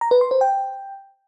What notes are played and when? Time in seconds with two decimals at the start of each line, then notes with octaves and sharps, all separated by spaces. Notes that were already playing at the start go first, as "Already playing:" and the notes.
0.01 A#5
0.11 B4
0.21 C6
0.31 C5
0.41 G5